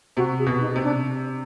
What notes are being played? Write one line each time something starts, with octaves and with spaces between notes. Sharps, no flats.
C3 F#4
G#4
B2
D#4
C3
D4